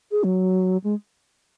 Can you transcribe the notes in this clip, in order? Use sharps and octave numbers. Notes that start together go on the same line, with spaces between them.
G#4
F#3
G#3